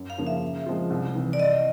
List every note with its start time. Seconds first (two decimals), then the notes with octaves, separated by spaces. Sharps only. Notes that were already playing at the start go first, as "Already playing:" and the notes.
Already playing: F#2
0.10 F5
0.18 C#3 F3 A#3
0.27 E5
0.42 C#3
0.66 F3 G#3 C4 F4
0.90 C2
1.14 C3 E3
1.33 D5
1.39 C2 D#5